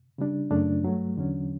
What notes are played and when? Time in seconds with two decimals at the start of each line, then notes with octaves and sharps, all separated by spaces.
0.18 C#3 G3 D4
0.50 F#2 C#3 F#3 A3 D4
0.83 G2 F#3 A3
1.16 E2 D3 F#3 C#4